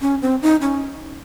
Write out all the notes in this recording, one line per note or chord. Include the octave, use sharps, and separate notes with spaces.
C#4
C4
D#4
C#4